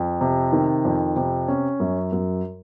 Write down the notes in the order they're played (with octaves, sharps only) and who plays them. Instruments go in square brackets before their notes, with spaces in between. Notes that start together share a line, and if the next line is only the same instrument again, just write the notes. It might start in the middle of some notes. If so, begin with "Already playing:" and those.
Already playing: [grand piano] F2
C3
D#3
F2
C3
C#4
F#2
F#2